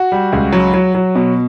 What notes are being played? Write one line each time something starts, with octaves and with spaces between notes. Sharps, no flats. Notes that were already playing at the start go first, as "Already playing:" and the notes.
Already playing: F#4
G3
C#2
F#3
F#3
F#3
B2